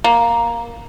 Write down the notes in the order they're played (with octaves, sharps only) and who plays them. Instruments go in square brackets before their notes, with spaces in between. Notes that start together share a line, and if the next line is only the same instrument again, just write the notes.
[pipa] A#3